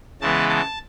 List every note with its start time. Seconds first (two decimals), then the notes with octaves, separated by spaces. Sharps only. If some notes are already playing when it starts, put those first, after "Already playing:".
0.21 C#3 E3 G#3 B3 A5
0.49 A5